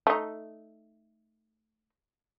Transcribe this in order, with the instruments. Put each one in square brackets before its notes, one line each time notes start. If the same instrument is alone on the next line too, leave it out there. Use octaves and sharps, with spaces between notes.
[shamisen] A3 D#4